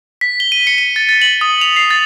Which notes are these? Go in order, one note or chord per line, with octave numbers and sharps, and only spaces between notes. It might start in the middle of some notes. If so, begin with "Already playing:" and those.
B6
G7
D#7
C#7
D#7
A6
A6
F#7
D#6
F7
C7
A6